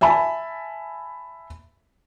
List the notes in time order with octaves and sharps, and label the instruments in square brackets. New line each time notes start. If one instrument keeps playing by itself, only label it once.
[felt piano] E5 G#5 A5 B5